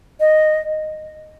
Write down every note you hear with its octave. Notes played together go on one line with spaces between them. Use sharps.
D#5